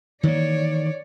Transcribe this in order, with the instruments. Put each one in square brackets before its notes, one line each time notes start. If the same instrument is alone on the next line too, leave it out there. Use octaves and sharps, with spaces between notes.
[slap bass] D#3 E3 A#3 [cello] C#5 D5